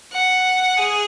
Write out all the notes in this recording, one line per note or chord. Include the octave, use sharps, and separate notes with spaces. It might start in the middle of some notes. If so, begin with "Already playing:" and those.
F#5
G#4